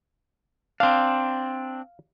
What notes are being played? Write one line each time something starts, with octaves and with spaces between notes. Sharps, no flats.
C4 D4 F5